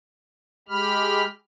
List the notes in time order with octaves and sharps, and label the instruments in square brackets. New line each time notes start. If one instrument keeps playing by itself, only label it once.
[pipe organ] G#3 G4 B5 F6